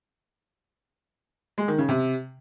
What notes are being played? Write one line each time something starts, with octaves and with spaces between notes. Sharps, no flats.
G#3
D#3
C#3
C3